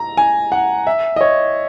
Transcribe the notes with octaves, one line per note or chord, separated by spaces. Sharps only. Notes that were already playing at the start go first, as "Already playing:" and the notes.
Already playing: A#5
G#5
F#5
E5
D#5
C#5